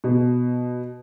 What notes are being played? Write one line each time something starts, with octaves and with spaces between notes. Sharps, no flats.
B2